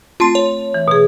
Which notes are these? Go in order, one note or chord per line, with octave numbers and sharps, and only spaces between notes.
A3 C4 F4 A5 C6
C#5
E3
B2 G#4